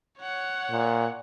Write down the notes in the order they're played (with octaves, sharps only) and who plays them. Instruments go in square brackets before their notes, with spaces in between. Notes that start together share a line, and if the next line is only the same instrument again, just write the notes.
[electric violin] C#5 F#5
[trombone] A#2